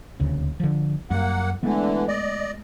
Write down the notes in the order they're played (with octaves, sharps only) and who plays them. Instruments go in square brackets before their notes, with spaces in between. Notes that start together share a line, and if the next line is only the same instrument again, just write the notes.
[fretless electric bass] D#1 D2 C#3
D3 F3
[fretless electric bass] F#2 G3 [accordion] A#3 F#5
[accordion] D3 E3 [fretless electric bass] G#3 A3 B3
[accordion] D5 D#5